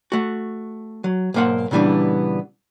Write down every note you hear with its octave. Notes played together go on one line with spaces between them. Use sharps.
A3 F#4
F#3
B1 G#2 A#3 C5 F#5
A#2 C#3 E3 G3 B3 D4